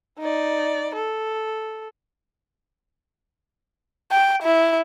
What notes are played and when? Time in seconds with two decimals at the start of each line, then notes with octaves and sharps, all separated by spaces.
0.19 D#4 D5
0.95 A4
4.12 G5
4.43 E4